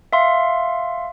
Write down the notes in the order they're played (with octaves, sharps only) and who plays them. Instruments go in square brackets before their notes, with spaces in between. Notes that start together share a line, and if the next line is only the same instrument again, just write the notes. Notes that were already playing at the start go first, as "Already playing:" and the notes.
[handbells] E5 F5 C6